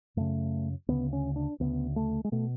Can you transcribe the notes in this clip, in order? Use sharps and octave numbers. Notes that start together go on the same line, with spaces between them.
F#2 C#3 A3
D2 C#3 B3
C#4
D4
D2 C#3 B3
A3
G#3
B2 A3